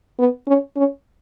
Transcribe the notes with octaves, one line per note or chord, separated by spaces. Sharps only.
B3
C#4
C#4